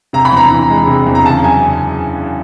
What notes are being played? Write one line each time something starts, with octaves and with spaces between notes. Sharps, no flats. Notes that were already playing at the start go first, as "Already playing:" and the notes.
C3 A#5
B5
E2 A#5
E3
G#3
C3
E2
A#5
C#3 A5
F#2 G#5